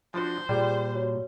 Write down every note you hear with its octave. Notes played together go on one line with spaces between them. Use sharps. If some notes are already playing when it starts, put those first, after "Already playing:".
F3 D4 F#4 C5
A#2 G3 G#4 D5 G5
F#4 C#5